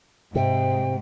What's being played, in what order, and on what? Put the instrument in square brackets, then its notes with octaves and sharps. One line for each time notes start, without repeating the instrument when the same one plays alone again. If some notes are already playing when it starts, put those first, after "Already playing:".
[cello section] G#2 [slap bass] C3 [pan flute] G5